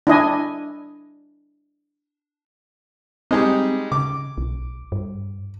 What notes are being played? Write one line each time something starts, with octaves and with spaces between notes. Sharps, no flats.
D4 E4 D#5 G#5
G3 G#3 C4 D#4
C#3 D6
B1
G2